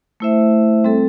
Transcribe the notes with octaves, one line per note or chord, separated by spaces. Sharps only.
A3 E4 C5 E5
G3 C4 A4